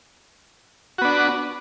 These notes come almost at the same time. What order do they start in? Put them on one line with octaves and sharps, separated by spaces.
F#4 B3 D4